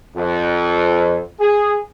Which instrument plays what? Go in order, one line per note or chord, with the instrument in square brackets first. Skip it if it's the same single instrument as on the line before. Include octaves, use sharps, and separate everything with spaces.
[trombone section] F2
G#4